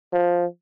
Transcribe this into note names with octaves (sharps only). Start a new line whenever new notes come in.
F3